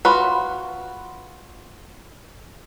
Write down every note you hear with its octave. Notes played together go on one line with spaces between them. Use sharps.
F4 F#4 B4